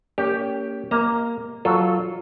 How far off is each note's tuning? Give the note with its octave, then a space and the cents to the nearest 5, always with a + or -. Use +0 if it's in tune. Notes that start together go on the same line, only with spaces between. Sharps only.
A#3 -25 C#4 +30 G4 +0
A#3 +0 D#5 +30 A#5 -25
F#3 +0 F4 +0 A4 -5